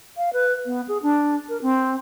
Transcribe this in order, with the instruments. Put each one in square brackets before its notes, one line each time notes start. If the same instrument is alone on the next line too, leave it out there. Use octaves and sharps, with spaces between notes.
[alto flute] F5
B4
B3
G#4
D4
A#4
C4